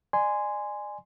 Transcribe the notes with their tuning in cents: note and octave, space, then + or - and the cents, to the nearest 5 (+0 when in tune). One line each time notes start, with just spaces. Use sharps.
D5 +35 G#5 +0 C6 -15